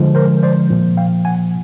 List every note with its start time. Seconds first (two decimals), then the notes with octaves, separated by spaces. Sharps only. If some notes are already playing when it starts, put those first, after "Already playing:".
Already playing: D3 F3 G#3
0.15 A#4 C5
0.43 C5 D5
0.70 A#2 F3 A#3
0.97 F5 G5
1.25 F#5 G#5